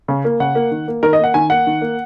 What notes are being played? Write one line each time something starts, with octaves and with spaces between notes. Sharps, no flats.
C#3
A#3
C#3 F#5
A#3
D#3
A#3
D#3 A#4
D#5
A#3 F#5
D#3 G#5
A#3 F#5
D#3
A#3